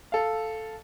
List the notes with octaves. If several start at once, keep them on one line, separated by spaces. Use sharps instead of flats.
A4 F5